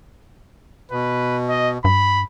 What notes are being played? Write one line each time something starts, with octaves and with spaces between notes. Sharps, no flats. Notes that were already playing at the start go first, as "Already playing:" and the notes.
B2 B4
D#5
G2 B5